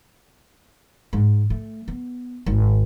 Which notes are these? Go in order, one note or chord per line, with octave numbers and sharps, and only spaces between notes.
G#2
A3
B3
G#1